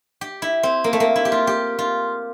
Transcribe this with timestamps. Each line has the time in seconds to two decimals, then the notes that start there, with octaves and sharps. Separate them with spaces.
0.21 G4
0.42 E4
0.63 C4
0.84 A#3
0.93 A3
1.00 A#3
1.16 E4
1.25 G4
1.32 F4
1.47 G4
1.79 F4